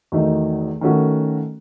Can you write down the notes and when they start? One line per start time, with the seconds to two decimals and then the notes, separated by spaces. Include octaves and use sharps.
0.12 E2 D#3 F#3 A3 D#4
0.81 D#3 A3 C#4 F#4 A4